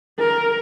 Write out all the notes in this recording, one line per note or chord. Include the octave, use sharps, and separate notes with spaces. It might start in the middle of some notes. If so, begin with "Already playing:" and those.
A#4